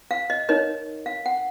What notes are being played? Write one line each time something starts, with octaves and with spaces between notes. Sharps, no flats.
F5
D#5
D#4 A#4 C#5 D#5
F5
F#5